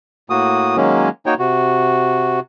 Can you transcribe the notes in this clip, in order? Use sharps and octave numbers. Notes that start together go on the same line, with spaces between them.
A2 A#3 F#4 D#6
D#3 F#3 G#3 A#3 C#4
A#3 D#4 F#4 C#5 G5
C3 F#4